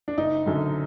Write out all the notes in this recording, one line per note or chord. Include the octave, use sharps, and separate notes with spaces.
D4
F#1 D#4
F#2 D3 F#3